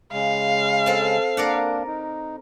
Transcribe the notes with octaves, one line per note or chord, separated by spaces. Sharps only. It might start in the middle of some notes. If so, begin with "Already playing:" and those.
C#3 G#3 F5
C4 A4
A#3 D4 A#4 D5 F#5
D#4